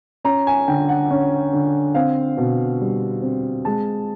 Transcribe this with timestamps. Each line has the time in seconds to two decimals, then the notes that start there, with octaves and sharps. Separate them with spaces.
0.24 C#4 A#5
0.47 G#5
0.68 D3 G5
0.89 F#5
1.10 C#4
1.53 D3
1.95 C4 F5
2.37 B2
2.81 G3
3.22 C4
3.65 G#3 A5